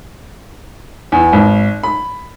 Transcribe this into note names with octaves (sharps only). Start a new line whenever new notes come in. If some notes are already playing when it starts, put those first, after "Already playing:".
E2
G#1
B5